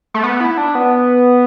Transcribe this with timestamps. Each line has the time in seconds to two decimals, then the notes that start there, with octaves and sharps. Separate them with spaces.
0.14 A3
0.24 B3
0.40 E4
0.58 D4
0.75 B3